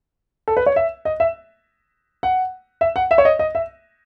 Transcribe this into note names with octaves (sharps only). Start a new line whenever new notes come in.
A4
B4
C#5
E5
D#5
E5
F#5
E5
F#5
E5
C#5
D#5
D#5
E5